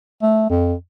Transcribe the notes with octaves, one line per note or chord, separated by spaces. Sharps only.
A3
F2